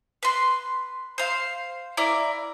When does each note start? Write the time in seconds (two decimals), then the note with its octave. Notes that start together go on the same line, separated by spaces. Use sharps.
0.23 B4 C6
1.18 C5 F5
1.97 E4 A#4 D5